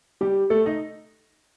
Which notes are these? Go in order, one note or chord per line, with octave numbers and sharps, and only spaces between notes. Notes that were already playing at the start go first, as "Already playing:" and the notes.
G3 G4
A3 A4
D#4 D#5